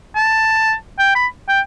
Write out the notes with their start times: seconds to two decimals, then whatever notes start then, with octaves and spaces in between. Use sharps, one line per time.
0.15 A5
0.99 G5
1.15 B5
1.49 G5